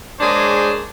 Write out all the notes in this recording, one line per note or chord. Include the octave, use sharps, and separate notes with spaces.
G#3 A#3 D4 G#4 C5 C#5